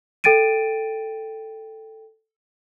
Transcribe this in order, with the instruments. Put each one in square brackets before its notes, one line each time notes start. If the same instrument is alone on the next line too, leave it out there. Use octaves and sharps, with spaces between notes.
[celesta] A4 G5 A6 D7 D#7